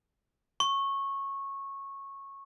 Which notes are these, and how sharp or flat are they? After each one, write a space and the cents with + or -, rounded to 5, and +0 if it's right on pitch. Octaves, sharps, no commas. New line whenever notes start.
C#6 -15